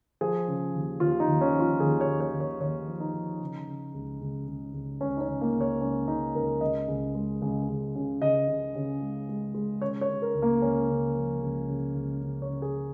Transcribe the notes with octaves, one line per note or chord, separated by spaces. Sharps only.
F3 G#4
C#3
D#2
D#2 F4
D#4
D#2
C#4
F3
F4
D#2 G#4
C#5
D#2
C#5
D#2
C#5
D#2 C#5
F3
D#4
F3
C#3
C#3
C#2
C#2
C#2
C#2
C#2 C#4
D#4
C#4
C#2
A#3
C#2
C#5
C#2 C#4
C#2 D#4
C#2 A#4
C#2 D#5
C#2
G#3
C#2
C#2
C#3
C#3 D#5
C#3
C#3
G#3
G#3
G#3
C#3 C#5
C#5
C#3
A#4
C#2
A#3
C#2 C#4
C#3
F3
C#2
C#3
C#2
C#3
C#5
C#3
G#4